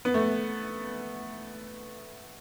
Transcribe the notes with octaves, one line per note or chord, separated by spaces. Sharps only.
B3
A3